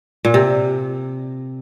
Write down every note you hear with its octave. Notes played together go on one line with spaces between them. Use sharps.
A#2
C3